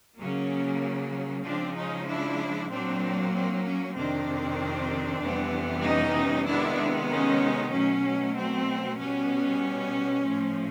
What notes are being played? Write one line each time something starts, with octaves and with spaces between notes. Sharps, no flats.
C#3 F#3 A#3 C#4
C#3 F3 G#3 C4 D4
C#4 D#4
D4 E4
A#2 F#3 A#3 C4 D4
C4
C#4
F2 C3 D#3 C4 D4
F2 C3 E3 G3 B3
C#4 D#4
C3 D#3 G#3 B3 D4 E4
C#4 D#4
B2 F#3 A3 C#4
C4
B2 G3 B3 C#4
A2 F3 A3